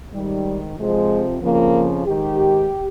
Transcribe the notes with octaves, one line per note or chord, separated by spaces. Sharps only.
G#2 D#3 G3
F2 C3 F3 G#3
F2 C#3 F3 A#3
G#2 D#3 G4